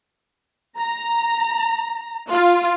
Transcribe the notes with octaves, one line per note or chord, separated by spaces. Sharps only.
A#5
F4